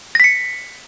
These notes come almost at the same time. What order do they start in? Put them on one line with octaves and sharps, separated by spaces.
A#6 B6 C#7